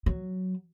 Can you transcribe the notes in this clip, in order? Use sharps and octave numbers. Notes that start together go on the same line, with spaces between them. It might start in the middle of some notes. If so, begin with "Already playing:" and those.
F#3